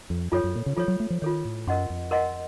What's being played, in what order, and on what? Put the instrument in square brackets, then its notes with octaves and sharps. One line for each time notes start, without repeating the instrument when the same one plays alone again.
[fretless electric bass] F2
[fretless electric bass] F#2 [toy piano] F4 A4 C#5
[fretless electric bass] F#2
A#2
C#3
[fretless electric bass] F3 [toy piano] F4 A4 C#5
[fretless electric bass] F#3
A3
F3
[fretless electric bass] D#3 [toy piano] F4 A4 C#5
[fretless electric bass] A2
[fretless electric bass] F#2 [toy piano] A#4 D#5 F#5 C6
[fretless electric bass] F2
[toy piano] A#4 D#5 F#5 C6